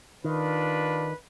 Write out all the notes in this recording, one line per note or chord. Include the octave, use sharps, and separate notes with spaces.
D#3 D4 F4 B4